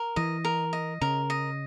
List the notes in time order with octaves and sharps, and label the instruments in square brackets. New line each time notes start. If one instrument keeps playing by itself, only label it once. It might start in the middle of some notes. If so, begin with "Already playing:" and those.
Already playing: [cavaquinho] A#4
[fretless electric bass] E3 [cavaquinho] D#5
[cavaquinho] A#4
D#5
[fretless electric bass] C#3 [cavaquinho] A#4
[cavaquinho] D#5